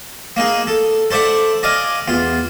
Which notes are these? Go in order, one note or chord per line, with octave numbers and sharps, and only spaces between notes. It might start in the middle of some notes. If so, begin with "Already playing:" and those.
A#3 D#4 G#4
A4
A4 C5 D5 E5 F#5
D5 D#5 F5 G#5
E2 F4